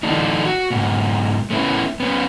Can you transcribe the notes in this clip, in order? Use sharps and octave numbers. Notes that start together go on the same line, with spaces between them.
D3 E3 A3 B3 D4 D#4
F#4
G#2 B2
A3 B3 C#4 E4
B3 C#4